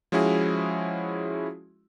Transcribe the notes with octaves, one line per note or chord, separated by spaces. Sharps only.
F3 G#3 C#4 E4 F#4 G#4